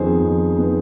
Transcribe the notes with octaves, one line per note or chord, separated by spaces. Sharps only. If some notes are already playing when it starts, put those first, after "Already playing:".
Already playing: F2 D#3 B3 G#4 C5
F2
D#3 B3